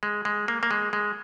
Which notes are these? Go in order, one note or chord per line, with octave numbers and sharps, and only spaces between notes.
G#3
G#3
A#3
A#3
G#3
G#3